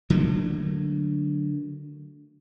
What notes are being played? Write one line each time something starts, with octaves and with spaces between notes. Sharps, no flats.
D3 F#3 A3 A#3